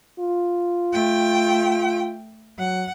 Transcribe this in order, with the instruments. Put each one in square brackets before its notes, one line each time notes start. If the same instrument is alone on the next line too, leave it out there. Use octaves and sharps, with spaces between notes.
[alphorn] F4
[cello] A3 G5
[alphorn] F#3 [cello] F#5